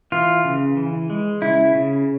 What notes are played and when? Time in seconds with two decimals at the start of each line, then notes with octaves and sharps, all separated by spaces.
0.12 E3 F4
0.44 C#3
0.77 E3
1.10 G#3
1.42 C#3 E4
1.75 C#3